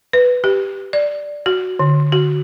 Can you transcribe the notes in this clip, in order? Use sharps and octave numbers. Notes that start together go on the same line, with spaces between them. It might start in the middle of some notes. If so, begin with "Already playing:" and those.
B4
G4
D5
F#4
D3
F#4